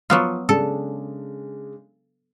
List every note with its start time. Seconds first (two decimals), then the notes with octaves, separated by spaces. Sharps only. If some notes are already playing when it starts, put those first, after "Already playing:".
0.10 F3 F#3 B3 F4
0.49 C#3 G#3 D4 A4